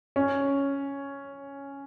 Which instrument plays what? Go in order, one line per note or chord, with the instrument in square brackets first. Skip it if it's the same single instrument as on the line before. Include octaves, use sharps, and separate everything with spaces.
[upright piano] C#4